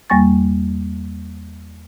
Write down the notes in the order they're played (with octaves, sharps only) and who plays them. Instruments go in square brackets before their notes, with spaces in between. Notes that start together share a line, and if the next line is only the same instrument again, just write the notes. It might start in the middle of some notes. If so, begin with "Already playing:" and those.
[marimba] E2 G3 A#3 G#5 C#6 A6